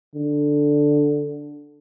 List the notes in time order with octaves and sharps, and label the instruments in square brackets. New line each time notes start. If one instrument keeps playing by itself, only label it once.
[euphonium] D3